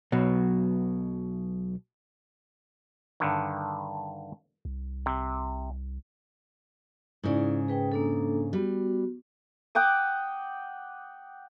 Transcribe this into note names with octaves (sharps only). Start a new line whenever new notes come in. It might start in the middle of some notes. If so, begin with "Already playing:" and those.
B1 B2 F#3
G2 D3 D#3
C2
C3
G#2 C#3 D#4 E4 D5
G#4 B4 G5
A#3 D4 A4
G3 B3 F#4
F#5 G5 D6 D#6